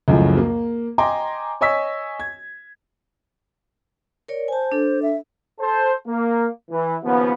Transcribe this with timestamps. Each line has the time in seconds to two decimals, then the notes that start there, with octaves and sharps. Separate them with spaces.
0.08 C#2 F#2 A2 F3
0.37 A#3
0.98 D#5 G5 G#5 A#5 C6 D6
1.61 C#5 D#5 G#5 C#6 E6 B6
2.20 G#6
4.28 A#4 C#5 D5
4.48 C5 G#5 A5
4.72 D4 A4
5.02 E5
5.60 A4 C5 A5
6.07 A#3
6.71 E3
7.03 D#2 C#3 F3 B3